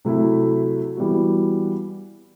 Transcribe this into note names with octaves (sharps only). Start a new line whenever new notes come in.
C3 F#3 A3 E4
E3 G3 B3 F#4